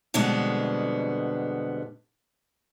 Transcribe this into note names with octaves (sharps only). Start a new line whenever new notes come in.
F2 B2 D3 G3 G#3 B3